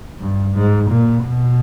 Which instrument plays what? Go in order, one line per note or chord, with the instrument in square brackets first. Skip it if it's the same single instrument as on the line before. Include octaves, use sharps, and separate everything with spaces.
[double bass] G2
G#2
A#2
B2